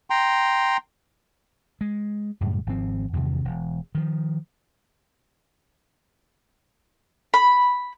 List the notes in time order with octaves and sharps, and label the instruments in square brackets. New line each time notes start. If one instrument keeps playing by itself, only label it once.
[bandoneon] G5 A#5 C6
[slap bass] G#3
F#2 A2 C#3 G3
G#1 F3 C4
E2 G2 C3 D#3
E1
D#3 F3
[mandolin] B5